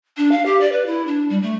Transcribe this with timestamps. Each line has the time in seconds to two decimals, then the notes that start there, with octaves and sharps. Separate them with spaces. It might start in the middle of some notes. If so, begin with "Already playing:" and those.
0.17 D4
0.32 F5
0.46 G4
0.60 D5
0.72 B4
0.86 E4
1.07 D4
1.30 G3
1.42 A3